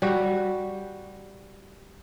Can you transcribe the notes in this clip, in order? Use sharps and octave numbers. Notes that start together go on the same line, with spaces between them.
G3 F#4